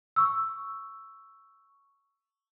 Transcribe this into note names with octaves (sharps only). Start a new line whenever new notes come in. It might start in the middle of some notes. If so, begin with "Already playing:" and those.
C#6 E6